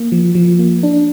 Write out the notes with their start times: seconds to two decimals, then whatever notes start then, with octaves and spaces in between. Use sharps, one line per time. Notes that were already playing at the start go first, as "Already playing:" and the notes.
Already playing: A#3
0.12 F3
0.35 F3
0.59 A#3
0.83 D4